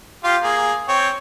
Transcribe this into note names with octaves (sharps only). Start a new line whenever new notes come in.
F4 G4 F5
A#3 G#4
C4 C#5